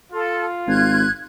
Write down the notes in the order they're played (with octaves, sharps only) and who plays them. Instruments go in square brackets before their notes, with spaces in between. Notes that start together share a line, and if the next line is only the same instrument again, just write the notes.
[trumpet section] F4 [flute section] A4
[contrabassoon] G#1 [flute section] F#6 G#6